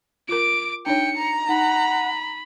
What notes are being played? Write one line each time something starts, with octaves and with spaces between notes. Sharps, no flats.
F4 A#4 D6 D7
D4 D#4 C#5 G5 C#7
A#5
D#4 F#5 B5